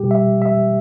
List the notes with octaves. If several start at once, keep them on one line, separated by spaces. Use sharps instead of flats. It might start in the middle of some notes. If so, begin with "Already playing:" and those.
Already playing: B2 G3 G4
E5
E5